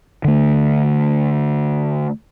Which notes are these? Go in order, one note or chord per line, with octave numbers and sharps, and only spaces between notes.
D3 A3